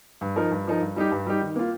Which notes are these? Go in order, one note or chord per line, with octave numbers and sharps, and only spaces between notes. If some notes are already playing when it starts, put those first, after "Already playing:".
G2
F3 D#4 A#4
G2
F3 D#4 A#4
G2
G3 D#4 G4
G2
G3 D#4 G4
D#3
A#3 F4